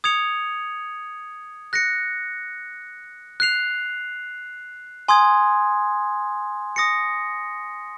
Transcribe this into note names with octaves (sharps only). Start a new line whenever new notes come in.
D#6 G#6 C#7 F7
F#6 A#6 C#7
F#6 C7 F7
G#5 C6 D#6 G#6
D#6 A#6 C#7